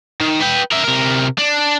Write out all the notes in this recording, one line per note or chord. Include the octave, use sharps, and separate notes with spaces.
D#3
B4 G5
A#4 E5
C3 A#4
D4